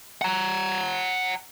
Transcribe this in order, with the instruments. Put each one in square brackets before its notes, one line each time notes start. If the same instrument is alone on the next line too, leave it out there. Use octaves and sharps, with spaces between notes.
[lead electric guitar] F#5 A#5